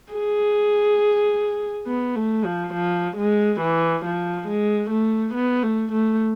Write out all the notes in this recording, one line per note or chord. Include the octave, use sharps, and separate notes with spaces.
G#4
B3
A3
F3
F3
G#3
E3
F3
G#3
A3
B3
A3
A3